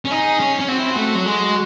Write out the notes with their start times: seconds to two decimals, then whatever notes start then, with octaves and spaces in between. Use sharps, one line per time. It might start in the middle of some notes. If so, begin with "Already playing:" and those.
0.05 C#4
0.11 D#4 G#4
0.40 C#4
0.60 C#4
0.68 C4 F#4
0.79 E4
0.92 A3 F#4
1.15 F#3
1.26 G#3